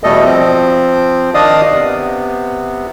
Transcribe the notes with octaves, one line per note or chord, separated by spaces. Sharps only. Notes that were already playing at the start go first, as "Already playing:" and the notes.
E2 B2 G3 A3 A4 D#5
F3 C4
D#3 D4 D5 D#5 F5 D#6
C3 B3